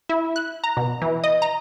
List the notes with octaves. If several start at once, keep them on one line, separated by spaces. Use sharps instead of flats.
E4
F#6
A#5
B2
E3
D#5
A#5